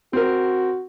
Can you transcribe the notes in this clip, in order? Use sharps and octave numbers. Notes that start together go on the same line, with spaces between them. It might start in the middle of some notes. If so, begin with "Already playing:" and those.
C4 F#4 A#4